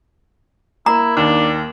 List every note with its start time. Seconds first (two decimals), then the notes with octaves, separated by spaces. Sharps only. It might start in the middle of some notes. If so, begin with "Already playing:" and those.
0.86 A#3 E4 A#5
1.17 D#2 D4